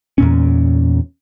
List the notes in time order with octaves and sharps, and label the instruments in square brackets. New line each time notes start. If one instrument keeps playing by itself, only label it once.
[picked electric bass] E2 A#2 C#4